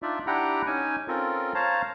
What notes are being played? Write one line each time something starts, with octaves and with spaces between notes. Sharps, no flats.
D4 D#4 F4 D5 E5
D4 E4 G4 F#5 G5 A#5
C#4 D#4 G#5
C4 C#4 F4 A4 A#4
C5 C#5 F5 A5 A#5